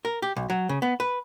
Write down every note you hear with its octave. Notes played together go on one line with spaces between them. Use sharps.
A#4
G4
B1
F#3
C#3
B3
B4